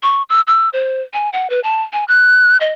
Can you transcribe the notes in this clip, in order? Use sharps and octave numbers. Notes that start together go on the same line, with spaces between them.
C#6
E6
E6
C5
G#5
F#5
B4
A5
G#5
F#6
D#5